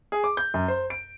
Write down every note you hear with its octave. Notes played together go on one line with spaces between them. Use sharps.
G#4
D6
G6
F#2
C5
D7